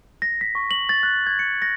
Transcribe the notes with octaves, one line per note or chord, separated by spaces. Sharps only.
A#6
B6
C#6
F#7
A6
F#6
G#6
C#7
A#6